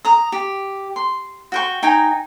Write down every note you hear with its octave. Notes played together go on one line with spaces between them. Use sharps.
A#5 D#6
G4
C6
F#4 G5 C#6
D#4 G5 G#5 A#5